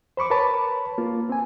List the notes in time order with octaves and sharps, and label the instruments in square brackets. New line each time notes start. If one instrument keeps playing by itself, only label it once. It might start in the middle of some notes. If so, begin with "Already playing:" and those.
[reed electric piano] C5 B5 C#6 D6
A#4 B4 C#5 A5 B5
A#3 F4
C4 G#5